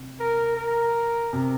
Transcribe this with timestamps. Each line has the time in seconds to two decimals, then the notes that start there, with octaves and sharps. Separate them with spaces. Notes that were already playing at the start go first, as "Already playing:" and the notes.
Already playing: C3
0.20 A#4
0.57 A#4
1.33 C3